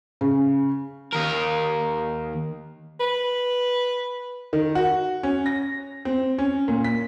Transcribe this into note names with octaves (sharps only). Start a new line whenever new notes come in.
C#3
D#2 A#4
B4
D#3
F#4
C#4
A#6
C4
C#4
A#2
B6